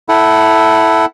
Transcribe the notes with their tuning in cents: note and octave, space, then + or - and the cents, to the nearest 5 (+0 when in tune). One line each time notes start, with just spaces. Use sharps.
E4 +0 A4 +0 F#5 +20